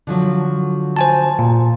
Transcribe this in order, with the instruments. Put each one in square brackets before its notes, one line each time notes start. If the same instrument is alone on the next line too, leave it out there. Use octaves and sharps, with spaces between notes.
[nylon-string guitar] D3 F3 F#3
[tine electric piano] C5 G#5 A5
A#2